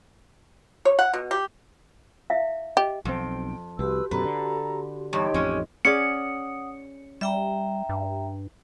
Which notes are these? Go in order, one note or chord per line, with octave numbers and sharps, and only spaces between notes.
C#5
F#5
B2
G4
E4 E5 F5
G4 D#5
B1 F2 C4 G5
C2 F#4 G4 B4 C6 E6
F#2 B2 D3 A4 B4 A#5
D3
E2 G2 D#4 G4 C#5 D#5 G5 C6
A1 F2 G#3 C#4
C#4 G#4 D5 F#5 D#6 C#7
G3 E5 G5 A#5
G2